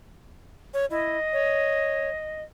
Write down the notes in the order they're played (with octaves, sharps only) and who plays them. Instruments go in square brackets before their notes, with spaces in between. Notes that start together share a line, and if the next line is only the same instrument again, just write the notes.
[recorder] C#5
[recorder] E4 [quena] D#5
[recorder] C#5